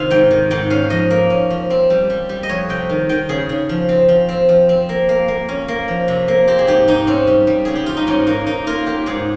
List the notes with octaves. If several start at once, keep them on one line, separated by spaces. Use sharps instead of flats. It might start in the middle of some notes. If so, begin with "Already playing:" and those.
Already playing: C3 D#3 D#4 F4 F5
G#2 G5
D#3
G#2 G5
C#4 F5
F3 D#5
A#3
C#4
F3
C4
G3
G3
G3
D#5
F2 C#5
C3 G5
D#3
D#3 G5
C#3 G#4
C#3
F3
C4
F3
C4
F3
C4
A#3
A#3
A#3
C#4
A#3
F3
C3
A#3
C4 G4
G#4
G#2 G4
G#2 D#4
C4 C#4
G3
G3
C#3 G#4
G4
G3 F4
D#4
G#2 C#4
A#3 D#4
A#3 D#4
A#3 F4
A#3 G4
G#2 G#4